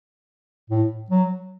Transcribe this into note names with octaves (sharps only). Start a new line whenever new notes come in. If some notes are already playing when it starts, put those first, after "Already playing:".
A2
F#3